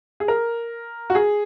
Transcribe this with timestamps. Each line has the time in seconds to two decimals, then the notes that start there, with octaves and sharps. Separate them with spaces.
0.20 G#4
0.28 A#4
1.10 F#4
1.15 G#4